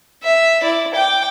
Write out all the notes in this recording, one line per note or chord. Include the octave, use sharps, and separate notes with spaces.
E5
E4 D5
G5 D6